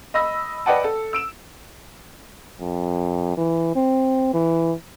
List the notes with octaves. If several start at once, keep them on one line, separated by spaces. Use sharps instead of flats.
D#5 B5 E6 A#6
B4 D5 D#5 F#5 G5 A5
A4
E6 D7 E7
F2
E3
C4
E3